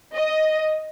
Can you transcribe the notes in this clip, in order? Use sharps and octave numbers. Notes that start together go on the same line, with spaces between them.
D#5